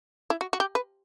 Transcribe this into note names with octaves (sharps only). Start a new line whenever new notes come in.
E4
F#4
F#4
G4
B4